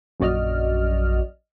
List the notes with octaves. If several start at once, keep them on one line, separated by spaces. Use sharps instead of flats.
A#1 F#2 F#4 D5 D#5 F6